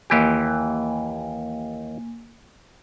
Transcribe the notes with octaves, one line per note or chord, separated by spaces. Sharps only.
D#2 E3 A#3 G4 G#5